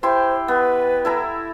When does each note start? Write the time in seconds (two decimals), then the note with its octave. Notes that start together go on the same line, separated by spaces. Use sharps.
0.03 E4 G4 C5 C6
0.48 B3 B4
1.05 E4 A4 A#5